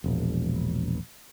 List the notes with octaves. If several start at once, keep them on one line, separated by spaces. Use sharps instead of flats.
E1 A#1